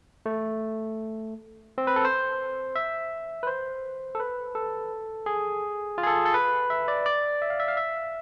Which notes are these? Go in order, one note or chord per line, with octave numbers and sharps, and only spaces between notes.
A3
C4
B4
A4
C5
E5
B4
C5
A4
B4
A4
G#4
F4
G#4
A4
A4
B4
E5
D5
D5
E5
F5
E5
F5
E5